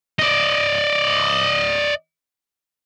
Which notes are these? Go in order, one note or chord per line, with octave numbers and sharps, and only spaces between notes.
D5 D#5